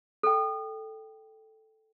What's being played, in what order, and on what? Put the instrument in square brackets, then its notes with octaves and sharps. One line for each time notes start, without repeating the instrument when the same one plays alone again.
[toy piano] A4 G5